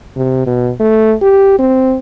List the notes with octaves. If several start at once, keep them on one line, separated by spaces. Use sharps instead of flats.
C3
B2
A3
G4
C4